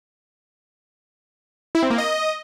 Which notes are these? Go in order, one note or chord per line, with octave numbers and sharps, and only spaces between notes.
E4
C4
A#3
D#5